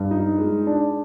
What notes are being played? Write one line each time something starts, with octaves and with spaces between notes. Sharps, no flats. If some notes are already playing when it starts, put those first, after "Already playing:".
Already playing: G2
D#4
G#3
D4